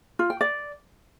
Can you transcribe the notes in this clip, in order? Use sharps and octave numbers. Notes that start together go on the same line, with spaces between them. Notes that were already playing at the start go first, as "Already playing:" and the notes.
F4
G5
D5